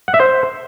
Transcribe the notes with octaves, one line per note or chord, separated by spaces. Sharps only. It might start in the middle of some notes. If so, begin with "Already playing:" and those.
F#5
E5
C5